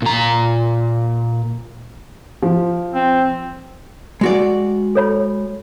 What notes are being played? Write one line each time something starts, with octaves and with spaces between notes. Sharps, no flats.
A#2 A#5
F3
C4
G#3 F#4 D5
A4 C#5 B5